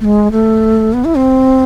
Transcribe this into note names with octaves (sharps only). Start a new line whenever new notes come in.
A3
G#3
A3
B3
E4
C4